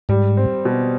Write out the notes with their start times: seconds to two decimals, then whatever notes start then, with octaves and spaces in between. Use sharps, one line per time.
0.09 G#2 G3
0.37 C4
0.65 B2